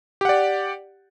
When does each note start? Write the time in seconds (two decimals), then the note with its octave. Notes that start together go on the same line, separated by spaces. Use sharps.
0.21 G4
0.25 F#5
0.29 D5